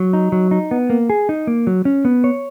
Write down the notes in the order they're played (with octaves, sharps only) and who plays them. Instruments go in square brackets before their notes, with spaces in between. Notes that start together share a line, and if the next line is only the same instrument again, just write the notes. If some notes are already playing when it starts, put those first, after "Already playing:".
Already playing: [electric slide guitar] F#3
D#4
F#3
D#4
B3
A#3
G#4
D#4
A#3
F#3
C#4
B3
C#5